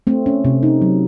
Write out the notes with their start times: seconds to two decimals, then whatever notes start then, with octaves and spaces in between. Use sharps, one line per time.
0.07 A3 C4
0.26 C#4
0.45 C3
0.63 D#4
0.82 F#3